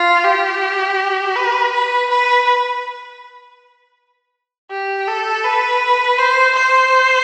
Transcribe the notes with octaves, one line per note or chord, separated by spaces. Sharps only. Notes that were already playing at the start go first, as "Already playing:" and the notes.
Already playing: F4
G4
B4
B4
B4
G4
A4
B4
C5
C5